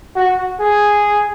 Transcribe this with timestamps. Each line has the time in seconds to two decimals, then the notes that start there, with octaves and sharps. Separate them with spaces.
0.16 F#4
0.60 G#4